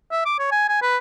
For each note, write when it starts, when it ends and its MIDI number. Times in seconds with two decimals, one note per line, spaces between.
0.11 0.22 76
0.25 0.37 86
0.39 0.48 73
0.51 0.67 80
0.68 0.79 80
0.82 0.97 71